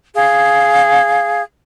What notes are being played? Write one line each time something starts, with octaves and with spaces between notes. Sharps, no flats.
G#4 F5